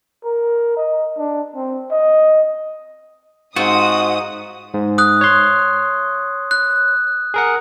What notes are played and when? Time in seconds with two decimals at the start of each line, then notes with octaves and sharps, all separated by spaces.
0.24 A#4
0.77 D#5
1.18 D4
1.56 C4
1.91 D#5
3.56 G#2 C4 F4 F#4 D#6
4.74 G#2
4.98 D#6 F#6
5.21 C#5 C6
6.51 F#6
7.34 G#4 A#4 F#5